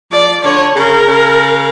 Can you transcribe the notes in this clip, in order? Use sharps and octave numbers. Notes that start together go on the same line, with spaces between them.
F3 D5
D3 C#5
C#3 A#4
C#3